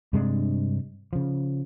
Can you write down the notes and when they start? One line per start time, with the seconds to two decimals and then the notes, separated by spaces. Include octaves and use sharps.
0.13 G2 C3 G#3 D4
1.13 C#3 F3